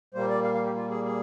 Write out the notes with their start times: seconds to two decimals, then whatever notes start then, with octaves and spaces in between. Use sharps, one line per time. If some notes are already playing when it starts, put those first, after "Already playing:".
0.14 A#2 G3 A#3 C5
0.29 D5
0.44 F5
0.55 F5
0.65 G4
0.75 F4
0.90 G#4
1.05 G#4